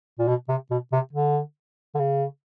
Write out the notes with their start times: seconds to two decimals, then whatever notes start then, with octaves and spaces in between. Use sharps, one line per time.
0.19 A#2
0.28 B2
0.49 C3
0.71 B2
0.92 C3
1.13 D3
1.95 D3
1.99 C#3